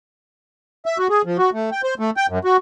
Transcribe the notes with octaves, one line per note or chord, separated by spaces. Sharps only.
E5
F#4
G#4
F3
F#4
A3
G5
C5
A3
G5
F#2
F#4